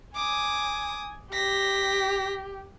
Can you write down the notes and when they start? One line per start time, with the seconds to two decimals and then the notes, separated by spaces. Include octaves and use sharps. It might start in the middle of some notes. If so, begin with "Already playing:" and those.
0.16 G#5 D6 D#6
1.32 G4 A#6 B6